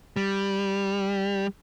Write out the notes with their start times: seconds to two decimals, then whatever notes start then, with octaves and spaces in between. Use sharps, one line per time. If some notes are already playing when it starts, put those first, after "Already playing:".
0.16 G3